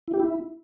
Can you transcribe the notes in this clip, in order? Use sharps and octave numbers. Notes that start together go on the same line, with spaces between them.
E4
G4
E4